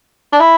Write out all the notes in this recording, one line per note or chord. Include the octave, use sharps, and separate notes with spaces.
D4
E4